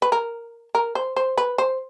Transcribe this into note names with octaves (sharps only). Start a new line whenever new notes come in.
B4
A#4
A#4
C5
C5
B4
C5